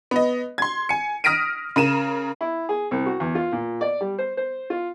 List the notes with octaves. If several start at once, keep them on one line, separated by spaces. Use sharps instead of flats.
B3 D#5
C6 G#6
G#5 C#7
D#6 F6 A#6 B6 D7 D#7
C#3 A#4 D#7 E7
E4
G#4
C2
F#4
E2
F4
A#2
D5
G3
C5
C5
F4